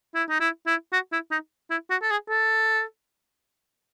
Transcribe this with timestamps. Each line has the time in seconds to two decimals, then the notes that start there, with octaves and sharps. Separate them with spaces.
0.15 E4
0.29 D#4
0.40 E4
0.67 E4
0.92 F#4
1.12 E4
1.31 D#4
1.70 E4
1.90 F#4
2.02 A4
2.10 G#4
2.29 A4